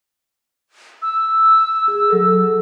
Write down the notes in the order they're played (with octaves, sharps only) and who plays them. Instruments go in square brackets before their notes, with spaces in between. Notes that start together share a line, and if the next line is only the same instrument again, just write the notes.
[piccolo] E6
[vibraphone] G#4
F#3 A4